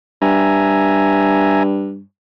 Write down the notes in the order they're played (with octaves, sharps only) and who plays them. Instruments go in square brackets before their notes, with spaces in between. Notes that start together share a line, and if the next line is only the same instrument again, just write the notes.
[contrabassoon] G2 [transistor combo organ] E5 G#5 A#5